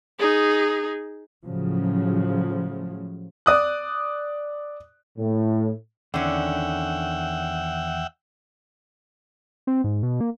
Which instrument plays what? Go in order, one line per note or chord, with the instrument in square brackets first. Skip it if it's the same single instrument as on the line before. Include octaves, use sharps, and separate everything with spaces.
[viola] D#4 G#4
[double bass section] A2 C#3 F3 F#3
[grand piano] D5 D#6 F#6
[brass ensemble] A2
[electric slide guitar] E2 D#3 [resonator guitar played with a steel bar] D3 C#4 [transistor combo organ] E5 F#5 G5
[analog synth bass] C4
G#2
B2
A#3